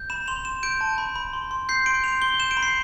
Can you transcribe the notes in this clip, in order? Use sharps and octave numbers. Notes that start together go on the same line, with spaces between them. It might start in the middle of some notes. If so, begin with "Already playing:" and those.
Already playing: G6
B5 E7
C6 F7
C6 E7
G6 D7
A5
B5
B5
C6
C6
G6 C7
C6 D7
G6 F7
C6 G7
G6 E7
D7
B5
C7